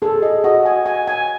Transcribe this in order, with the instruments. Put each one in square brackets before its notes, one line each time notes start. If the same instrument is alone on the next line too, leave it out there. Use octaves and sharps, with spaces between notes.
[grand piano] G#4 [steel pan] A4
[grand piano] G#4 [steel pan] D#5
[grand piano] F#4 [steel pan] D#5
[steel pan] G#5
G#5
G#5